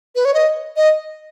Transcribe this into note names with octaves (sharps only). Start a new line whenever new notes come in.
B4
C#5
D#5
D#5